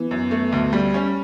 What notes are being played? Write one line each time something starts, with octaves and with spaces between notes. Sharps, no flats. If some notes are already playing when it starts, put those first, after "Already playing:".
Already playing: E3 B3
F#2
A3
D2
G3
C#4